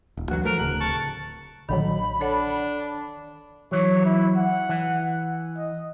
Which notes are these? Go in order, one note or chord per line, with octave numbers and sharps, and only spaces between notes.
D#1
D2 E3 F#3 F#4
F3 A3 A#4
D1 D2 C#3 F#6
A5 C#6
A#1 D3 D#3 F#3 B5
D4 A4 C#5 F#5
E3 F#3 C#5
E4
F#5
E3
D#5